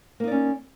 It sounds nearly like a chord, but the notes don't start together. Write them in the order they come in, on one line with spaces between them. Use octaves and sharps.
A#3 D#4 D5 C#4